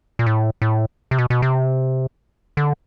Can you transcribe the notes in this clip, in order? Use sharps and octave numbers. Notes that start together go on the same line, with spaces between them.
A#2
A2
A2
C3
B2
B2
C3
D3